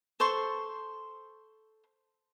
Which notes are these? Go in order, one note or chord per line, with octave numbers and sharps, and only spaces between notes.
A4 C5 C6 C#6